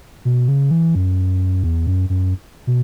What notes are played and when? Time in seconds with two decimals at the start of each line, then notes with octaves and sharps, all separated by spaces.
0.25 B2
0.48 C#3
0.71 E3
0.95 F#2
1.63 E2
1.87 F#2
2.09 F#2
2.67 B2